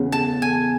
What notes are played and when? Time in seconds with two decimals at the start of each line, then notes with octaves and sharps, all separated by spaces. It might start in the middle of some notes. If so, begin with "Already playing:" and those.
Already playing: E2 C#3
0.12 A5
0.42 G#5